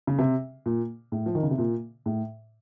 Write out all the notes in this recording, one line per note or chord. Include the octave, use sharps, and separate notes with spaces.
C#3
C3
A#2
A2
F3
D#3
C#3
C3
A#2
A2